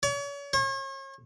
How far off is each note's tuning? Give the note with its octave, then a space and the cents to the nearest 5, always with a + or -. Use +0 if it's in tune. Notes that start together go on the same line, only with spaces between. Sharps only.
C#5 +40
C#5 -40